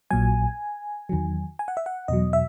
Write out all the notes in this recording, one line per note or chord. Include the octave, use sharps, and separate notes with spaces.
A#1 A#2 F#3 G#5
E2 D#3 F#3
G#5
F#5
E5
F#5
E2 B2 F#3 D#5
E5